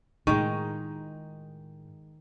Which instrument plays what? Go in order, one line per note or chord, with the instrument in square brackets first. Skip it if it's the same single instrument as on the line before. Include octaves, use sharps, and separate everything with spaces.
[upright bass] A2 F4 [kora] D#3 [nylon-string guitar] G#3 D#4 [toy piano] C#6